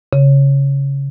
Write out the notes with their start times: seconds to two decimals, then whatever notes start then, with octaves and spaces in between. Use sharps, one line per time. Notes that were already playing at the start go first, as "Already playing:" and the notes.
0.13 C#3